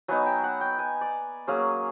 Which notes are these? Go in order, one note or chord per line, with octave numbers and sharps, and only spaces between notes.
F#3 B3 D#4 G#5
G5
F#5
G5
G#5
D5
F#3 A#3 C#4 G#4